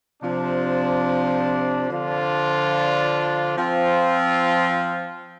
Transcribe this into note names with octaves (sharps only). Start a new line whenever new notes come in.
C3 F3 D4
D3 F3 D4 F4
F3 C4 F4